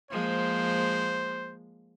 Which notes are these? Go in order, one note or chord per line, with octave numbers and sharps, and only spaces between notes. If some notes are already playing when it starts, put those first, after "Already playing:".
F3 G#3 A#3 C5